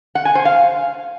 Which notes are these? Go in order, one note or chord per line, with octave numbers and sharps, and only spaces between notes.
F#5
G#5
C5
F5